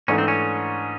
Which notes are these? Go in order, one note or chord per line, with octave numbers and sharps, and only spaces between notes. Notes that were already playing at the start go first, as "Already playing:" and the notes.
G#2 E3 A3 C#4 D4
C4
C#4